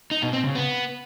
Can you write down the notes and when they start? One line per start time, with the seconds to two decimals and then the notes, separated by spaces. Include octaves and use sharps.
0.11 D#4
0.22 B2
0.33 C4
0.44 C#3
0.55 B3